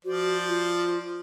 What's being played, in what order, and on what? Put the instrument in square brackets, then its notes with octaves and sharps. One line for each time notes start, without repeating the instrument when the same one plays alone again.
[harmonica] F3 C5 D5 [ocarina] F#4
[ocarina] F4